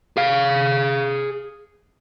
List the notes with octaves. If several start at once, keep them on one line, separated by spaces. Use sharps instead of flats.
G#4 F5